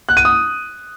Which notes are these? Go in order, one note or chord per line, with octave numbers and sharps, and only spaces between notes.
F#6
D#7
D#6